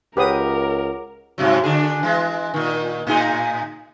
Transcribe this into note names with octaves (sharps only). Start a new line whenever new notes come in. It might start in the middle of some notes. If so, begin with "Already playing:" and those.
C#2 G4 A#4 B4 C#5 F#5 D6 D#6
G2 C3 F#3
D3 D4 G#4
E3 G#3
A#2 D#3
A2 D#4 G#4